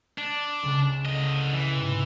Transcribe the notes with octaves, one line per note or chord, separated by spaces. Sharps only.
D4 E7
C#2 C#3 A6
D3 D#5
E3
G#2 C3